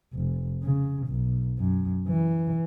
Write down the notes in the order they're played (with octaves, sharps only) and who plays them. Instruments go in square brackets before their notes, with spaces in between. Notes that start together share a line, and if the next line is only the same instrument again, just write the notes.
[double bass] F1
C#3
B1
F#2
E3